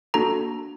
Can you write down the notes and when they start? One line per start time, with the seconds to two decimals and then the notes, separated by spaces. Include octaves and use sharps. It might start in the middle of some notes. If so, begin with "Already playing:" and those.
0.14 A#3 D4 F#4 A4 A#5